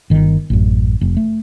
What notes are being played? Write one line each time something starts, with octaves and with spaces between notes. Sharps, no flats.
G1 D#3
A1 F#2
F1
A3